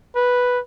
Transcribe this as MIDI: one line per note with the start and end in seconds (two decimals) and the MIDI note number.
0.15 0.60 71